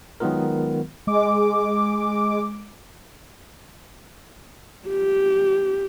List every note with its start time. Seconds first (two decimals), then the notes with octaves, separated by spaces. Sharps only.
0.20 D#3 F#3 G#3 B3 F4 A#4
1.07 G#3 D6
4.88 G4